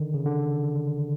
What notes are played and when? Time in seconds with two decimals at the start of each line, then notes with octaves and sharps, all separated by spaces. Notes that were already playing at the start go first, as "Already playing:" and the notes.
Already playing: D3 D#3
0.14 C#3
0.26 D3